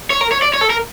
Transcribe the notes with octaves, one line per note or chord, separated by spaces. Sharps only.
C#5
A#4
C#5
D5
C#5
A4
A#4